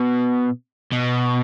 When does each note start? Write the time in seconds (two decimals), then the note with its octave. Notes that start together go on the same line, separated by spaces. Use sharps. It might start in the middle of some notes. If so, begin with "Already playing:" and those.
Already playing: B2
0.92 B2